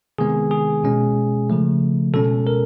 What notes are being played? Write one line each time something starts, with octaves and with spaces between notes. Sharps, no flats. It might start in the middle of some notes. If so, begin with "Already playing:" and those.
C3 D#3 G#3 B3 G#4
G#4
B2 G#3 C#4
C#3 F3 A3
B2 G#3 C#4 A4
A#4